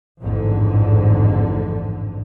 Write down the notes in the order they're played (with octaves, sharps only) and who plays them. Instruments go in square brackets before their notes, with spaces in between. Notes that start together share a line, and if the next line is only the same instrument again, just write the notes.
[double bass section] A1 F2 G#2 D3